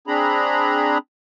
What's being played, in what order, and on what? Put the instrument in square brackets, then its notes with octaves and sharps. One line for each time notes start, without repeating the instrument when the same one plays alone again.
[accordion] C4 D4 G#4 A#5 B5